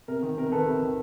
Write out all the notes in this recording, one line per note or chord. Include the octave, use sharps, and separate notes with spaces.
C3 A#4
D#3
C3 A#4
D#3 A4 B4
C3
D#3